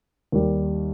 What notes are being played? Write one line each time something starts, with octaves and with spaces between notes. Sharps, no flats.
D#2 D#3 G3